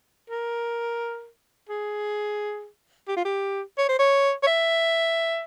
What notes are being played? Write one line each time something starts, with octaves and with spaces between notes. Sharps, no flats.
A#4
G#4
G4
F4
G4
C#5
C5
C#5
C#5
E5